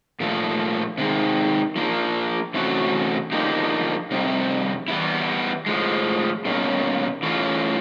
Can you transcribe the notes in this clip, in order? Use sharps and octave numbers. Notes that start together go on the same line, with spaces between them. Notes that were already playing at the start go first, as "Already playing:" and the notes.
A#2 F3 A3
C3 D#3 G#3
F3 A#3 D4
C3 E3 A3 C#4 F#4
D3 F3 A#3 D#4 G4
F2 C3 G3
E3 G3 B3 E4
A2 F3 G#3
B2 G3 A#3 C#4
E3 A3 C#4 F4